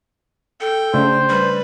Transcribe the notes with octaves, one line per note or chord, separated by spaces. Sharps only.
A4 G5
C#3 A3 D4 C5
G3 B4